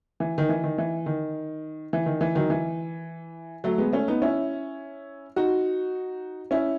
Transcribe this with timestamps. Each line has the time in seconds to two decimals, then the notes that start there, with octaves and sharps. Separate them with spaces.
0.20 E3
0.38 D#3
0.49 E3
0.64 D#3
0.78 E3
1.06 D#3
1.93 E3
2.06 D#3
2.21 E3
2.35 D#3 F#3
2.50 E3
3.64 F#3 A3
3.78 G#3 B3
3.93 A3 C#4
4.08 B3 D#4
4.22 C#4 E4
5.36 D#4 F#4
6.51 C#4 E4